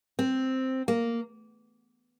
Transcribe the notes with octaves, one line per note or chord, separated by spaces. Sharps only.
C4
A#3